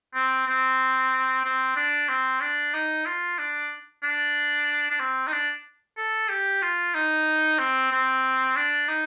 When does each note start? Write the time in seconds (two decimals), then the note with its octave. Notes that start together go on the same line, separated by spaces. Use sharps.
0.14 C4
0.47 C4
1.44 C4
1.76 D4
2.09 C4
2.41 D4
2.74 D#4
3.06 F4
3.39 D4
4.03 D4
4.91 D4
5.00 C4
5.27 D#4
5.32 D4
5.98 A4
6.29 G4
6.62 F4
6.94 D#4
7.59 C4
7.92 C4
8.56 D4
8.89 D#4